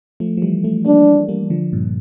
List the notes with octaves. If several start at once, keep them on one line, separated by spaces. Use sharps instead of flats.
F3 A3
F3
E3 G3
F3 A3
G3 A#3 D4
G3 A#3
D3 F3
G2 A#2